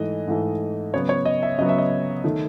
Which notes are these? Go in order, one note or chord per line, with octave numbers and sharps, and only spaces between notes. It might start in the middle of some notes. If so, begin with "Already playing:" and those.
Already playing: G#2 E3 A3 D#5
G#2 E3 A3
C#3 F#3 B3 C#5
C#5
D#5
E5
C#3 F#3 B3 D#5
E5
D#5
D#3 A3